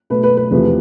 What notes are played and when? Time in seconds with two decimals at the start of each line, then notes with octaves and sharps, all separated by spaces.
0.10 B2 A3 B4
0.23 B4
0.37 B4
0.51 E2 C3 F3 A3 B4